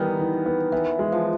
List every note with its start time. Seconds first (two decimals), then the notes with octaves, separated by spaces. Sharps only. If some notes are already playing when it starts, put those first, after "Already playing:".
Already playing: D#3 E3 G3 B3
0.19 E3
0.46 B3
0.72 E3 B3
0.99 G#3
1.12 F3